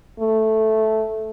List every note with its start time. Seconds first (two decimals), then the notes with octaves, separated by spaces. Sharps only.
0.20 A3